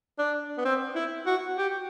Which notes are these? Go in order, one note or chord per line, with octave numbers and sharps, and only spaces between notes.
D4
B3
C4
E4
F#4
G4